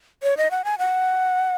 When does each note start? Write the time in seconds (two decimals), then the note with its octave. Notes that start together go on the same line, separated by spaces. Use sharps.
0.23 C#5
0.37 D#5
0.51 F#5
0.65 G#5
0.78 F#5